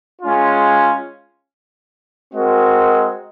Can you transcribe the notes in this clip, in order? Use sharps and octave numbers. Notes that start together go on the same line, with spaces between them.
G#3 C#4 F4
G#3 C4 F#4 A#4 D#5